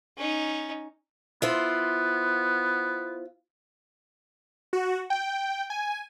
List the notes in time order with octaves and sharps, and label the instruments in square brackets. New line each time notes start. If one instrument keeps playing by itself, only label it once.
[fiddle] C#4 D#4
[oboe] B3 [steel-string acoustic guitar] E4 F4 C5
[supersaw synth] F#4
G5
G#5